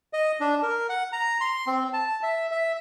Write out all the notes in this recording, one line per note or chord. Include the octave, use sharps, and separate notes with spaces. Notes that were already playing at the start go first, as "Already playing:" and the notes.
D#5
D4
A#4
F#5
A#5
C6
C4
A5
E5
E5